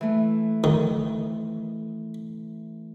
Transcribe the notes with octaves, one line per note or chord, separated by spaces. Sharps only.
E3 A3
F2 D#3 D#6